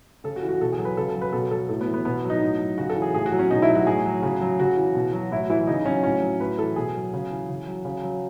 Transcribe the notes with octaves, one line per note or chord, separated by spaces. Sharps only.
C#3 A4
F#4
E3
F#4
B2 A4
G#4
F#3
B4
C#3 A4
A4
F#3
B4
B2 A4
F#3 A4
A2 A4
B3
E3
B3
B2 B3
F#3
D#4
A2
F#3
C#3 F#4
A4
E3
G#4
A2 G#4
F#4
F#3
C#4
B2 D#4
E4
F#3
F#4
A2 G#4
F#3
C#3
F#3
C#3 F#4
E3
B2
F#3
A2 E4
E3 E4
C#3 D#4
F#3 C#4
A2 C#4
F#3
A2 B4
E3 A4
B2 G#4
F#3
C#3
E3
C#3
F#3
C#3
F#3